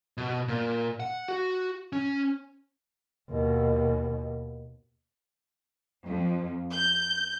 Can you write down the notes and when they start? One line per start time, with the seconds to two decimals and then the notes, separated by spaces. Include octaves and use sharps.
0.17 B2
0.48 A#2
1.00 F#5
1.28 F#4
1.93 C#4
3.30 D#2 B2
6.05 F2
6.72 G6